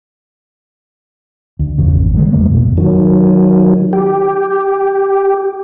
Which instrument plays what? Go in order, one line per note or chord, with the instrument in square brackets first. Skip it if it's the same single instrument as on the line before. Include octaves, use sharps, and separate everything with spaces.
[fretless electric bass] D2
G1 E2 C#3
G#1
D3 D#3 G3 G#3
E2 G3 A3 A#3
A1 F2 B2
[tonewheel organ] D#3 F#3
G4